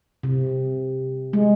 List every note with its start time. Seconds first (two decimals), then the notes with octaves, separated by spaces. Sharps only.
0.23 C3
1.33 G#3